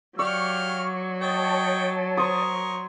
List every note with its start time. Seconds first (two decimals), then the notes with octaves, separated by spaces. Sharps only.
0.19 F#3 G4 D5 F5 C#6 F6
1.21 C#5 D#5 G5 A5 C#6
2.17 A#4 C5 C#6 D#6